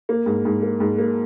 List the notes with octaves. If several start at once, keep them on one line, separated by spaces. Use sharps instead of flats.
A#3
G#2
G#2
A#3
G#2
A#3